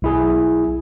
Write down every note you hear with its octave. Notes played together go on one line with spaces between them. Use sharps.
B1 E4 G#4